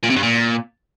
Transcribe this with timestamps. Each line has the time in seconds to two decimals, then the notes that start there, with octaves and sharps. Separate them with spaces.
0.04 A#2
0.10 C3
0.16 G2
0.23 A#2